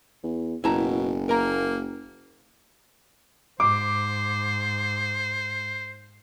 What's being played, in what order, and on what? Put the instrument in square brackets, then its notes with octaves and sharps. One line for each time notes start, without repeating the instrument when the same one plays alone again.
[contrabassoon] E2
[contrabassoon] F#1 [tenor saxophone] B2 [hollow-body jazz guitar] E4 A5 A#5
[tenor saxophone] A#3 [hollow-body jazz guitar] A#4 A#5
[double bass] G#2 [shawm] C5 [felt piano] D6